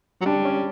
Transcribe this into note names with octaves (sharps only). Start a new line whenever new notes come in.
F#3
G3 D4
C#4